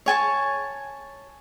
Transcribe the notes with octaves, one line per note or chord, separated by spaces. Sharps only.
C#5 G#5 A5 C#6